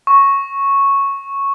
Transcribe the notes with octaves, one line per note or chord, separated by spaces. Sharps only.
C#6